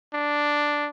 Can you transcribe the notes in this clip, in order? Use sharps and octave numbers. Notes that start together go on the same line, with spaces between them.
D4